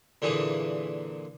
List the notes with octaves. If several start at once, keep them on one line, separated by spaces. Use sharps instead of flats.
A#2 D3 E3 G#4 C#6